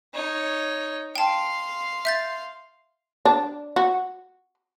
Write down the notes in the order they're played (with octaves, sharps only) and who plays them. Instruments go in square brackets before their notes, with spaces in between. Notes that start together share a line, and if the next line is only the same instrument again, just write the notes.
[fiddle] D#4 C#5
[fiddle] F5 C6 [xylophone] G5 A5
[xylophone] E5 G6 A6
[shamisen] D4
F#4